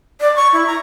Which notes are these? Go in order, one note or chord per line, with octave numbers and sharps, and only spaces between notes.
D5
C#6
E4
A#5